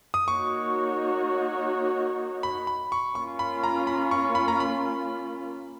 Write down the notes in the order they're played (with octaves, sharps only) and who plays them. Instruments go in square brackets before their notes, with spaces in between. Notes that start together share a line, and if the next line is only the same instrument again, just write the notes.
[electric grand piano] D#6
[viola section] A#3 D#4 F#4 C#5 [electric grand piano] C#6
[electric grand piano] B5
B5
C#6
[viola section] A#3 C#4 F4 [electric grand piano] C#6
[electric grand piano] B5
A#5
B5
C#6
B5
A#5
B5